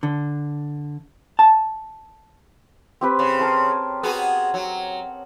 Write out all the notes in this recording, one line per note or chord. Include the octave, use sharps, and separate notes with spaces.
D3
A5
C4 G4 B4
C#3
A#4 A5 C6
B3 F#4 G#4
F#3